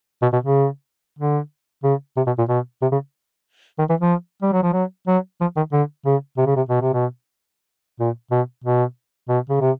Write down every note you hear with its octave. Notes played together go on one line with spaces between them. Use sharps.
B2
B2
C#3
D3
C#3
C3
B2
A#2
B2
C3
C#3
D#3
E3
F3
G3
F#3
F3
F#3
F#3
F3
D#3
D3
C#3
C3
C#3
C3
B2
C3
B2
A#2
B2
B2
B2
C#3
C3